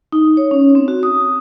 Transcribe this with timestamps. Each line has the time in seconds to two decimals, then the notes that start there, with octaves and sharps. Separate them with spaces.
0.12 D#4
0.37 C#5
0.51 C#4
0.75 C4
0.88 F#4
1.03 D#6